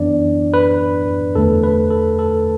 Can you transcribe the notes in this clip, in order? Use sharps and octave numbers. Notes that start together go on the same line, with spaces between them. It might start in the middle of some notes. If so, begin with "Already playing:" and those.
Already playing: F#2 E3 B3 D4 D5
B4
E2 D3 A3 A4
B4
A4
A4